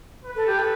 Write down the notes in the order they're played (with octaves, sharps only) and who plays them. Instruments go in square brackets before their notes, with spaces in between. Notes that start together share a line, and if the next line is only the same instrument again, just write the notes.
[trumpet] B4
[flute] A4
G4
A4